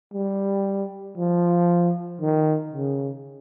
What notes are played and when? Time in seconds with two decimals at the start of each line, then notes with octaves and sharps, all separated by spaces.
0.13 G3
1.17 F3
2.21 D#3
2.73 C#3